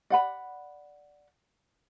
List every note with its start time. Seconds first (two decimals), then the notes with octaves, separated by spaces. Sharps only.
0.10 D5 F#5 B5